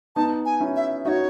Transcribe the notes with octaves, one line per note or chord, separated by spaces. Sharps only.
B3 D#4 A5
G#5
C#4 E4
E5
D#4 F#4 C#5 E5